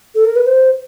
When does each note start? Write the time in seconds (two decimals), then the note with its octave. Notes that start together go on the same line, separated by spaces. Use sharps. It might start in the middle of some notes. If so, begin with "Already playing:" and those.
0.15 A4
0.25 A#4
0.36 B4
0.46 C5